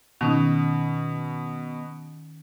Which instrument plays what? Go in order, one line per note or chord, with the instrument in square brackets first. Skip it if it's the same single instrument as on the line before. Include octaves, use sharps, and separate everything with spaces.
[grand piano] B2 [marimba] D#3 C#4 D#4